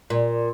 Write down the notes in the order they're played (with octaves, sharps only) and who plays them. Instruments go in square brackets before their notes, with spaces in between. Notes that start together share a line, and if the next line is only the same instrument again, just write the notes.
[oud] A#2